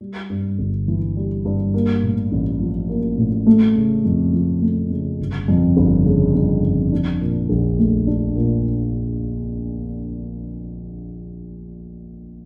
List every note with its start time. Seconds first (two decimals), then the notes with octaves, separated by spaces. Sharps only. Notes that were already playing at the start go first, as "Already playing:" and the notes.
0.01 G3
0.30 G2
0.59 G1
0.88 E3
1.17 G3
1.45 G2
1.74 A#3
2.03 A2
2.32 A1
2.60 F3
2.89 A#3
3.18 A2
3.47 A3
3.76 C#3
4.04 F2
4.33 F3
4.62 A3
4.91 C#3
5.19 G1
5.48 F2
5.77 G1
6.06 C#3
6.34 G1
6.63 F2
6.92 D4
7.21 A#2
7.49 A#1
7.79 A3
8.07 D4
8.36 A#2